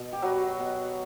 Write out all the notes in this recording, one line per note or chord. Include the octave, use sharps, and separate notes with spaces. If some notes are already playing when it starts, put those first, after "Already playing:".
Already playing: B2
G4
F#3 G3 F#4
B2